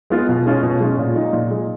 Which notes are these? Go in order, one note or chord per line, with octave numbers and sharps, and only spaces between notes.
G#3 B3 F4
B2
G#3 C#4 F4
B2
G#3 C#4 F4
A#2
G#3 D#4
A#2
G#3 D#4